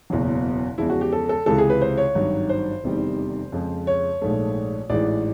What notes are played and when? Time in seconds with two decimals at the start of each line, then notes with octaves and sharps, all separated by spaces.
0.10 F#1 E2 B2 F#3
0.78 E2 C#3 F3 G#3 E4
0.90 F#4
1.01 G4
1.12 A4
1.29 A4
1.46 C#2 C3 E3 G#3 A4
1.58 G#4
1.70 B4
1.82 C5
1.98 C#5
2.15 G#1 G2 D#3 F#3
2.49 C5
2.84 F1 E2 C3 D#3 G3
3.52 F2 C#3 F3 G#3
3.87 C#5
4.21 A#1 G#2 F3 A3
4.90 A1 G#2 E3 G#3 D5